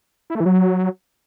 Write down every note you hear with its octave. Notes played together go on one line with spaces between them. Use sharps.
E4
A3
E3
F#3